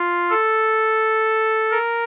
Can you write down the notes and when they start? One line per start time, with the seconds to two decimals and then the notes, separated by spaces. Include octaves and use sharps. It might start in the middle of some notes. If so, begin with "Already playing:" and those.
Already playing: F4
0.30 A4
1.71 A#4